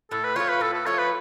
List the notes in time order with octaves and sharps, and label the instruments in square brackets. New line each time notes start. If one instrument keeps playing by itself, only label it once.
[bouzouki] A2 [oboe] A4
[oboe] B4
[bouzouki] F3 A3 F4 [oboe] C#5
[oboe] B4
[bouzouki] A2 [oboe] A4
[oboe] A4
[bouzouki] F3 A3 F4 [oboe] C#5
[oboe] B4